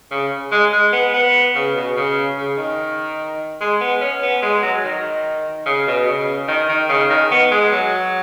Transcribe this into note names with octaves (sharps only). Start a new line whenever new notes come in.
C#3
G#3
G#3
B3
B3
C#3
B2
C#3
C#3
D#3
G#3
B3
C#4
B3
G#3
F#3
D#3
C#3
B2
C#3
D#3
D#3
C#3
D#3
B3
G#3
F#3